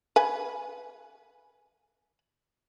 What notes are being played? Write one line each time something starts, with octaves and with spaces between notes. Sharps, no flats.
B4 G#5